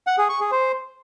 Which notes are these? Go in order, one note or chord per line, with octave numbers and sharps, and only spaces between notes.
F#5
G#4
C#6
G#4
C5